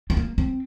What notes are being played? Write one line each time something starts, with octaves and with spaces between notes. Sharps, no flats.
C4
A#3
C4